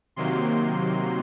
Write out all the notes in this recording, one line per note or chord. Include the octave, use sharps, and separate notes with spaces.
C3 D#3 F#3 A#3 C6